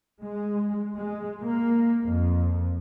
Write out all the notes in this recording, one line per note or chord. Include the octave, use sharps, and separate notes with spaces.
G#3
G#3
A#3
F2